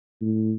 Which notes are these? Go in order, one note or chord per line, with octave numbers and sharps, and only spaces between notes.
A2